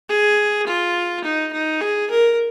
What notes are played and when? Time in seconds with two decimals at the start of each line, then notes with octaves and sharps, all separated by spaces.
0.09 G#4
0.67 F4
1.24 D#4
1.53 D#4
1.81 G#4
2.10 A#4